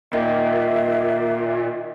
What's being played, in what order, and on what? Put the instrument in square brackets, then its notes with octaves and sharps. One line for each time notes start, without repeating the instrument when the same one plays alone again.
[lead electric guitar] A#2 [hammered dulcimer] D#3 [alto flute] E5